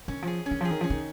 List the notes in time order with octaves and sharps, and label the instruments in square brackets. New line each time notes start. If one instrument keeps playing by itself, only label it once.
[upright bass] D#3 [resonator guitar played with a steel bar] C#4
[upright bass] F3 [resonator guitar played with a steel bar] G#4
[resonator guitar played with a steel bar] C#4
[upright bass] D#3
[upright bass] F3 [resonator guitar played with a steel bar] G#4
[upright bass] D#3
[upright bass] F3 [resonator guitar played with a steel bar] C#4
[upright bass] D#3